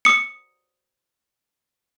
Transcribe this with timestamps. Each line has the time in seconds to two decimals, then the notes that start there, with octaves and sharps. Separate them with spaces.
0.05 D#6 C#7